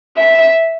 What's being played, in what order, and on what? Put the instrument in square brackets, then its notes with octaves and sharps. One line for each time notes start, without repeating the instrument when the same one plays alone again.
[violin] E5